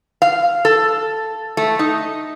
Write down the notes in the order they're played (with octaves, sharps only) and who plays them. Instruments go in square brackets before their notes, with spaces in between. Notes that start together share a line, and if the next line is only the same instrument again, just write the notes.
[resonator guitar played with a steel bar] F5
A4
A3
D#4